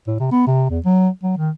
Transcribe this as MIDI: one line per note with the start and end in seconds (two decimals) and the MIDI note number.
0.07 0.15 45
0.20 0.30 48
0.31 0.43 59
0.47 0.69 48
0.70 0.79 40
0.85 1.09 54
1.23 1.33 54
1.37 1.50 51